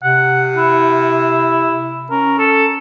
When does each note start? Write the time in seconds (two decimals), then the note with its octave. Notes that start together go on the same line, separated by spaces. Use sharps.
0.03 C3 F#5
0.57 E4
2.10 C#4 A#4
2.39 A4